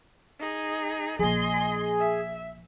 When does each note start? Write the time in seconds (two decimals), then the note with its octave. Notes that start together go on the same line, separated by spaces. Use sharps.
0.39 D#4 G#4
1.19 A#1 F3 D4 G#4 D#5 C6
2.00 E5